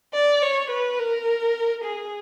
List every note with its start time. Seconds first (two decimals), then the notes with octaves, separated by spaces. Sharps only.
0.13 D5
0.42 C#5
0.70 B4
0.99 A#4
1.84 G#4